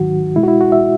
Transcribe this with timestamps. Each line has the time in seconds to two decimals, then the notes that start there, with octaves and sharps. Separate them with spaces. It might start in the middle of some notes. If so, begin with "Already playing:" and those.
Already playing: G#2 D#3 F#3 F#4
0.36 B2 G#3 E4
0.43 F#4
0.48 E4
0.61 F#4
0.72 E5